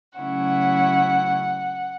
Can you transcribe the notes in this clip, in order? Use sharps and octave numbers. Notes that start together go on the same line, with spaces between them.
C#3 F#3 A3 C#4 E4 F#5